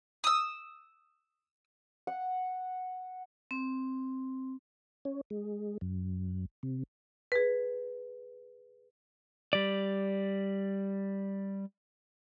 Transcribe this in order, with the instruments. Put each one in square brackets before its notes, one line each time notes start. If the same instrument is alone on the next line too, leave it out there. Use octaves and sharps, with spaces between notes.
[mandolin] D#6 E6
[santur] F#5
[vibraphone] C4
[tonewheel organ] C#4
G#3
F#2
C3
[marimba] G#4 B4
[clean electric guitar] G3 D5